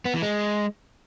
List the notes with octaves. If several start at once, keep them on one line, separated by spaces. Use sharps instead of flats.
B3
E3
G#3